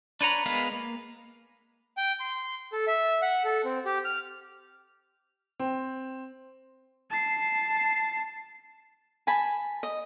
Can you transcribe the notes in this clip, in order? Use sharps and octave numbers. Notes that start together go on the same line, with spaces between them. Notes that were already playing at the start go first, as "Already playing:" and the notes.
D4 B4 C#5 A#5 B5
G#3 B3 A#4 B4 F5
A#3
G5
C6
A4
E5
F#5
A4
C4
G4
F6
C4
A5 C7
G#5 A5 B5
D#5